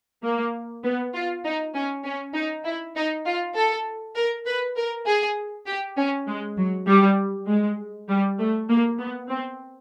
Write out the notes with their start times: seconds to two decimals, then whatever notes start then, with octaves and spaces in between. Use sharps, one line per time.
0.24 A#3
0.84 B3
1.14 F4
1.45 D#4
1.74 C#4
2.05 C#4
2.34 D#4
2.65 E4
2.96 D#4
3.26 F4
3.56 A4
4.16 A#4
4.46 B4
4.77 A#4
5.07 G#4
5.66 G4
5.98 C#4
6.28 G#3
6.57 F#3
6.87 G3
7.48 G#3
8.09 G3
8.39 A3
8.69 A#3
8.99 B3
9.29 C4